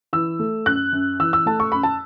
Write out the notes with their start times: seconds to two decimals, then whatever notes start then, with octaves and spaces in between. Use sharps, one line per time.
0.13 E3 E6
0.39 A3
0.66 F#2 F#6
0.92 F#2
1.20 E3 E6
1.33 E6
1.46 A3 A5
1.60 C#6
1.72 F#2 B5
1.83 A5